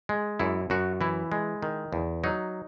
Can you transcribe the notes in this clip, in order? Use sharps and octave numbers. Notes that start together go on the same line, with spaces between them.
G#3
F#2 E4
F#2 F#4
E3 E4
G#3
D#3
E2
F#3 D#4